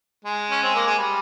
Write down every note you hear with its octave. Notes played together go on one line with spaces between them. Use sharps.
G#3
C#4
C4
A#3
G#3
G3